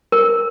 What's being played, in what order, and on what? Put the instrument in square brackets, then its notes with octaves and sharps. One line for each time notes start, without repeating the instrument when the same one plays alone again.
[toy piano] A#4